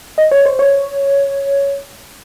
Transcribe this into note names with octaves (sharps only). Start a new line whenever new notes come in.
D#5
C#5
C5
C#5